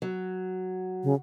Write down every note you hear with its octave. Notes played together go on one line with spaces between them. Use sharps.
F#3
C#3